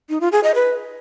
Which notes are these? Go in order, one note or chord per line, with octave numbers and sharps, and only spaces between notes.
D#4
F4
G#4
D#5
B4